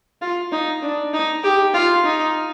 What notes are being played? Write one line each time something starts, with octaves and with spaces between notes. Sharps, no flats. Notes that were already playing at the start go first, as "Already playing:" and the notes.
F4
D#4
D4
D#4
G4
F4
D#4